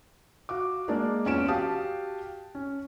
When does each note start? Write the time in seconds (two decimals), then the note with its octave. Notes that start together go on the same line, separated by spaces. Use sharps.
0.49 F#4 F5 D6
0.88 G#3 A#3 D4 A#4 D5
1.26 E2 C#4 F4 D7 E7
1.48 F#4 G4 F5 G5 A5 D#6
2.55 C#4